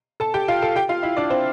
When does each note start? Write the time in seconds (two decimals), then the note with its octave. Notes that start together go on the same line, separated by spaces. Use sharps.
0.20 A4 A5
0.34 G4 G5
0.48 F4 F5
0.62 A4 A5
0.76 G4 G5
0.89 F4 F5
1.03 E4 E5
1.17 D4 D5
1.30 C4 C5